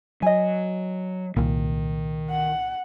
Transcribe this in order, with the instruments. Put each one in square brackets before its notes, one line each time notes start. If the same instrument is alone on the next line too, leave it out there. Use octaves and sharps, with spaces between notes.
[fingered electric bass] F#3 [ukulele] D#5 G#5
[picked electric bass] C2 A#2 [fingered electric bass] D#3
[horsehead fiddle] F#5